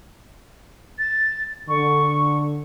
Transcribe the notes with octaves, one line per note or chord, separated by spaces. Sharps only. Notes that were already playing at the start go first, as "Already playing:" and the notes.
A6
D3 C#6